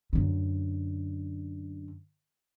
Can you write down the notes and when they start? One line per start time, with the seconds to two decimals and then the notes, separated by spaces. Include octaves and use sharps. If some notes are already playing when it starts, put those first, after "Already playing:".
0.13 F#2 D3